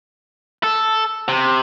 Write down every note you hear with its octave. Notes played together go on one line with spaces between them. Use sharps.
A4
C3